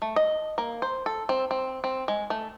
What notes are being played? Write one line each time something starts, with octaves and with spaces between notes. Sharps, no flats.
A3
D#5
A#3
C5
A4
C4
C4
C4
G#3
A3